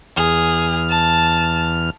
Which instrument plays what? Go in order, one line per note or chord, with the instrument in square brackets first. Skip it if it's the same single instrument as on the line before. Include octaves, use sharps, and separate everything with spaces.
[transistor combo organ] E2 F6 [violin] G#4
[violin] A5